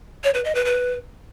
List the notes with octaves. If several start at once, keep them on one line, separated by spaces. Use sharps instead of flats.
C#5
B4
D#5
B4
B4